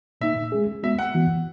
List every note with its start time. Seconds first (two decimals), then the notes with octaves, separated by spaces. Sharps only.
0.21 A#2 A#3 D#4 E5
0.52 G#3 C#4 G#4
0.83 G#3 B3 F#4 E5
0.99 F#5
1.14 E3 B3 F#4